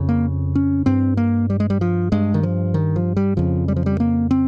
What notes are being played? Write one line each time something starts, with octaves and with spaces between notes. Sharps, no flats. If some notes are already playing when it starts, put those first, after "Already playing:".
Already playing: F2 C#3
A#3
C#4
G2 C4
A#3
G3
G#3
G3
F3
G2 G#3
D#3
F3
D#3
F3
G3
F2 C#3 F3
G3
F3
G3
A#3
C4